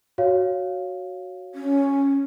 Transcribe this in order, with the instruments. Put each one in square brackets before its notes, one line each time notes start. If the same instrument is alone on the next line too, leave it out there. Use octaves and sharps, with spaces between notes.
[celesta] F#4 C#5 F5
[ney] C#4